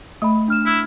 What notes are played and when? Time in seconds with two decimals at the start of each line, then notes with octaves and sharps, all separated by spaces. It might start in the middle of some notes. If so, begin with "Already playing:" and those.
0.22 A3 D#5 B5
0.48 D4 F6 E7
0.66 E4